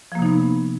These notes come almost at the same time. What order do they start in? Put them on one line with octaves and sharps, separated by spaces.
F3 A#3 C3 D#4 B3